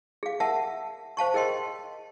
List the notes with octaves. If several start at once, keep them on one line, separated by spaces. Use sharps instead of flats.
G#4 F5
A#4 E5 F#5 A5
C5 F5 A5 C#6
G#4 A#4 D#5 G5 C6